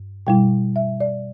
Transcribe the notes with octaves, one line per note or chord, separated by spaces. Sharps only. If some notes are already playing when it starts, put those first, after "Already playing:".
Already playing: G2
B2 G3 E4 G5
E5
D5